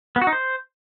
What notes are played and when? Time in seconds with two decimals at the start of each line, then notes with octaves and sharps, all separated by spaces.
0.16 B3
0.22 F#4
0.27 D#4
0.33 C5